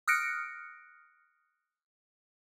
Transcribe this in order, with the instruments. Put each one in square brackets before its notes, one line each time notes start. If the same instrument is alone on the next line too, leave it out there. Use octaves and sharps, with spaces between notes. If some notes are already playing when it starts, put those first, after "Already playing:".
[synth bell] D#6 F6 F#6 A#6 C#7 D7